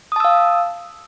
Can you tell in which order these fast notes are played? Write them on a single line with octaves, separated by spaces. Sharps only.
D#6 A5 E6 F5